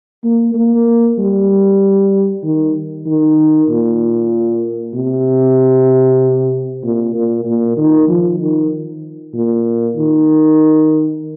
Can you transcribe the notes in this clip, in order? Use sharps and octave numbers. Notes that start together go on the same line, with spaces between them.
A#3
A#3
G3
D#3
D#3
A#2
C3
A#2
A#2
A#2
D#3
F3
D#3
A#2
D#3